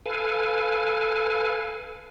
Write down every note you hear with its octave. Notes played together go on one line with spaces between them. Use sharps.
A4 B4 F5 G#5